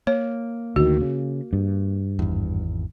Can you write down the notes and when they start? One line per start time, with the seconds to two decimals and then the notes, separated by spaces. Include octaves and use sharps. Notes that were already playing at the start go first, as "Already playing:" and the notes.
0.07 A#3 C#5
0.76 D2 D#3 F#4
1.02 C#3
1.53 G2
2.19 G#1 E2